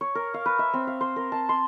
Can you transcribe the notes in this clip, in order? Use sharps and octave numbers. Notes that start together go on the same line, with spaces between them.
C#5
A#4
F5
B4
E5
C4
F5
C5
A#4
A5
C6